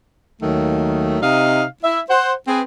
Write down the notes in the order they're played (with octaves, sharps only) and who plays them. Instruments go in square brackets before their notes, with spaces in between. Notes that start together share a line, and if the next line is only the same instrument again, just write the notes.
[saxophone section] D#2 D#3 F#3 A3
C3 D#4 D#5 F5
E4 E5
C5 F#5
C4 G#4 B4